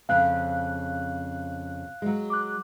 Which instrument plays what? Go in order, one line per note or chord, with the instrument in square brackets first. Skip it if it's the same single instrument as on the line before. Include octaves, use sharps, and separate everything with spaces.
[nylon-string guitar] F2 C#3 C4 [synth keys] F5 F#6
[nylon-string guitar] F#3 G#3
[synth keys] D6 F#6